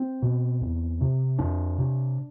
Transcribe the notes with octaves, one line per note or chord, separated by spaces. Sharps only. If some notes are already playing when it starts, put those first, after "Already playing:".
Already playing: C4
B2
E2
C3
F2 D4
C3